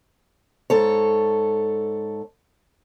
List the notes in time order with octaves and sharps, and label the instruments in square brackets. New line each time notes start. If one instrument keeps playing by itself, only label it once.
[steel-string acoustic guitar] G#2 A4 C#5